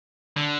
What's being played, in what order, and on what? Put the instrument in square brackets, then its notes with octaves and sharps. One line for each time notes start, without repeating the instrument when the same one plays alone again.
[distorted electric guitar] D3